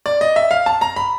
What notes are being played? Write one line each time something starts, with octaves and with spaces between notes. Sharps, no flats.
D5
D#5
E5
F5
A5
A#5
B5